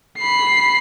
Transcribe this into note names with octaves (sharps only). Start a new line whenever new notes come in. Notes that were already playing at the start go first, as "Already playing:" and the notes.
B5 C7